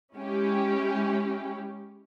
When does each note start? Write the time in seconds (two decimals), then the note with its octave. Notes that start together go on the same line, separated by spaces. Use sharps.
0.16 G#3 C#4 E4 G4